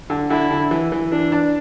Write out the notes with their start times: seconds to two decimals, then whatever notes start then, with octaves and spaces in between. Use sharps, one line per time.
0.10 D3
0.30 D3 E4
0.51 D3
0.71 E3
0.92 E3
1.11 E3 D4
1.32 D4